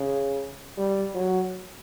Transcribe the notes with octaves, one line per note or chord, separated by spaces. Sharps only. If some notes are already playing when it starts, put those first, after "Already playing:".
Already playing: C#3
G3
F#3